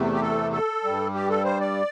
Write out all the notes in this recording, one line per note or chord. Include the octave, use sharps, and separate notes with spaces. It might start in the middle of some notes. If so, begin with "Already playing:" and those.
Already playing: E2 C3 A3
G4
A4
A4
G2 G3
G4
A4
C5
D5